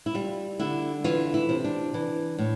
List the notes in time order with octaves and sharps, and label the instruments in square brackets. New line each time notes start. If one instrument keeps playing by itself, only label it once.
[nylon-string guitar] E4
G3 F4
D3 E4
E3 F4
E4
C3
D4
E3
A2